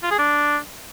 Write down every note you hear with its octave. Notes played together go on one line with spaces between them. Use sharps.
F4
G#4
D4